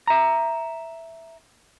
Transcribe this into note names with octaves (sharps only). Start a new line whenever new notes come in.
E5 A#5